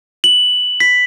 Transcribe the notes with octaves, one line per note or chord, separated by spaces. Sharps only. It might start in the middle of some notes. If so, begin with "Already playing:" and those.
F#7
B6